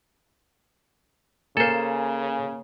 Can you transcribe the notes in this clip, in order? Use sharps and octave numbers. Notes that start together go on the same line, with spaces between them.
C#3 A#3 A4 A#4 C5 G#5